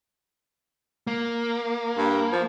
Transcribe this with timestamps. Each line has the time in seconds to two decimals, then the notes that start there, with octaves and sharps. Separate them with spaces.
1.07 A#3
1.97 G2
2.32 F3